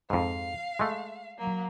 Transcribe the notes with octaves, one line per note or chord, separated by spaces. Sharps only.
F2 G#2 F5
G#3 A3
F#3 A#3